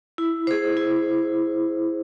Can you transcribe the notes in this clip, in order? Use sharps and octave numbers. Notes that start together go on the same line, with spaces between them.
E4
G#4 C5
E4